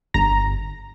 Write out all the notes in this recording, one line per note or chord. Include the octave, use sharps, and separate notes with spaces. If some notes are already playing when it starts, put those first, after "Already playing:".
G1 A#5